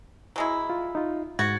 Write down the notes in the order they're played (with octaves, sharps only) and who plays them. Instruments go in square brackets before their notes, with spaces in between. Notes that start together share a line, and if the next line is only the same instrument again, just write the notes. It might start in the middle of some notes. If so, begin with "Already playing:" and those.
[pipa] F#3 G#3 E4
[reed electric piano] F4
D#4 F4
[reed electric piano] G#2 G#6 A6 [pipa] F#4